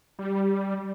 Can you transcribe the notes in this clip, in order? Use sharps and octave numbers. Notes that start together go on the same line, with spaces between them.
G3